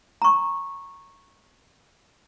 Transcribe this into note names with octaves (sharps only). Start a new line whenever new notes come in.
A#5 C#6